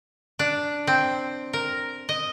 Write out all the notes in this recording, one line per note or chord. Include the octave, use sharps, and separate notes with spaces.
D4
C4
A#4
D#5